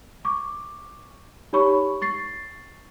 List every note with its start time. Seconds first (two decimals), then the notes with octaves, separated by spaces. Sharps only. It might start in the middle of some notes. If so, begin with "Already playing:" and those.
0.25 C#6 D6
1.53 D#4 G4 C#5 B5 C#6
2.02 C#6 A6 C7